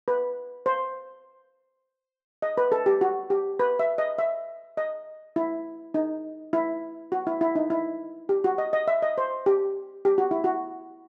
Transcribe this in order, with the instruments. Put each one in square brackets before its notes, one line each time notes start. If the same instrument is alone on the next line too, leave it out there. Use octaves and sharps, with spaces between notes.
[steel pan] B4
C5
D#5
B4
A4
G4
F#4
G4
B4
E5
D#5
E5
D#5
E4
D#4
E4
F#4
E4
E4
D#4
E4
G4
F#4
D#5
D#5
E5
D#5
C5
G4
G4
F#4
E4
F#4